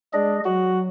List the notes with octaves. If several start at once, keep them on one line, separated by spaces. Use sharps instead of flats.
G#3 D4 G#4 D#5
F#3 F#4